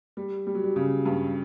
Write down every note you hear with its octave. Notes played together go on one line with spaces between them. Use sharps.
G3
G3
F#3
G3
C#3
G2